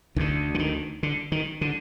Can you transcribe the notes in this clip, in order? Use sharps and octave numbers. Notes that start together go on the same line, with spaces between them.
D2 D3 D#3
D3
D#3
D3
D#3
D3